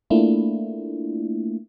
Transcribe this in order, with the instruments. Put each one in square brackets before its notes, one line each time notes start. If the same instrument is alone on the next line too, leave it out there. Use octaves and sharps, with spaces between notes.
[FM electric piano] A3 A#3 D4 E4 F4